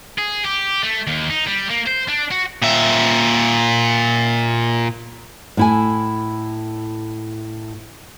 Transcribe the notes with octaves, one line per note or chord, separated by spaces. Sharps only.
G#4
G4
A3
D#2
D#4
G3
A#3
C5
D4
F#4
A#2 E5
A2 E4 G#5